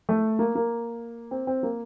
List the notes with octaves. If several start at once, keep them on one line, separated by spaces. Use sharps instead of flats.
A3
A#3
A#3
C4
C4
A#3